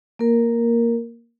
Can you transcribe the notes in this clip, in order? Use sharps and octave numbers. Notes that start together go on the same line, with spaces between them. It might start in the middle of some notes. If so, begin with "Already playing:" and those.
A#3 A#4